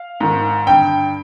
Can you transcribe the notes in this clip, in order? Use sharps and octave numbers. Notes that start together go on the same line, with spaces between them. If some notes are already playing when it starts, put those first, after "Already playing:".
Already playing: F5
G#2 D#3
G2 D3 G5